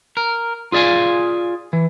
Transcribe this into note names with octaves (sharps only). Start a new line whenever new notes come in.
A#4
F4 G#4 D5 F5 G#5
E3